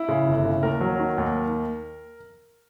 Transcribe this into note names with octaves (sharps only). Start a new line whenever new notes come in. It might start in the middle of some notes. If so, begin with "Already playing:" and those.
Already playing: E4
C#3
G1
C#3
D#2 A#4
F#3
D#3
D#2